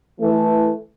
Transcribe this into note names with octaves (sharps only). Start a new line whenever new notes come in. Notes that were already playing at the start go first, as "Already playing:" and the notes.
E3 A3